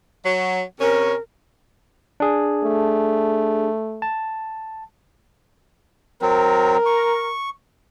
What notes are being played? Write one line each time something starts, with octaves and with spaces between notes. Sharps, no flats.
F#3
C3 C#4 A#4
D4 G#4
A3
A5
F#3 C4 A#4
C#6